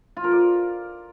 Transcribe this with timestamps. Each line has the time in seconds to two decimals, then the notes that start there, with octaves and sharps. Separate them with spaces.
0.17 F4
0.24 A#4
0.31 D5